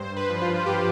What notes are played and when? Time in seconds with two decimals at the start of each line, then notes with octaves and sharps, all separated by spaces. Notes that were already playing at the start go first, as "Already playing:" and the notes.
Already playing: G2 C5
0.16 B4
0.30 F3
0.42 F4
0.66 G2 G4